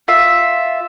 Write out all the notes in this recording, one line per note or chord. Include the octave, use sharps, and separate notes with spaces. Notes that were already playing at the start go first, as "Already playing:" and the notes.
F4 E5